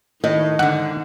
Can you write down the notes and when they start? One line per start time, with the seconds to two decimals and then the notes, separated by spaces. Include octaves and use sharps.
0.24 A2 D#3 D#5
0.59 G#2 D3 F#5